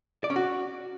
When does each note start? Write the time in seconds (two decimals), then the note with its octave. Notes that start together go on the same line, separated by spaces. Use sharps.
0.24 D5
0.30 C#4
0.36 F#4